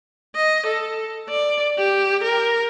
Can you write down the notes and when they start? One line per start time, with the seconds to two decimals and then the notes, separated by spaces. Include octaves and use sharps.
0.35 D#5
0.66 A4
1.29 D5
1.78 G4
2.23 A#4